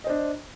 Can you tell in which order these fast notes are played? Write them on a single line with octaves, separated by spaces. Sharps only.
D#5 C5 D4